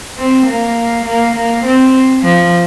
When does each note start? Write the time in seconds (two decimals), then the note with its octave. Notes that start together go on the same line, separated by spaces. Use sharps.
0.18 C4
0.47 A#3
1.05 A#3
1.34 A#3
1.63 C4
2.21 F3